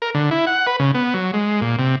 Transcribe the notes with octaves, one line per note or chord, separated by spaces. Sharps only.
A#4
D3
E4
F#5
B4
C#3
B3
F#3
G#3
A#2
C3